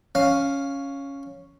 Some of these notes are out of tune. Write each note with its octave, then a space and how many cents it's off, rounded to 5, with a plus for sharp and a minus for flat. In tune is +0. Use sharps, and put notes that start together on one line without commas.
C#4 +0 F5 +0